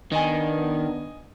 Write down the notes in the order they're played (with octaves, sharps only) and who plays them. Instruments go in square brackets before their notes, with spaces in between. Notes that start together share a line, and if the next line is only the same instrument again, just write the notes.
[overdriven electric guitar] D#3 [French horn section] B3 D4 [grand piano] D#5 G#5